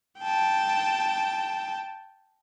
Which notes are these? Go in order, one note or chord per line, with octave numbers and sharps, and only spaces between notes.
G5 A5